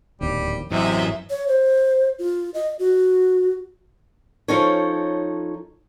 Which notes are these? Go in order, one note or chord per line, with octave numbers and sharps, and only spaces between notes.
D1 A#1 D#2 G3
A1 F#2 C3 E3 D#5 E5
C#5
C5
F4
D#5
F#4
F3 C#4 D#4 A4 C#5